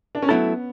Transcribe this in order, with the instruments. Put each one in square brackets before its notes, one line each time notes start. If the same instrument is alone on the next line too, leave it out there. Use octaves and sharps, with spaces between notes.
[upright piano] D4
C#4
[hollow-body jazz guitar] F#3 A3 E4 A4 [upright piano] B3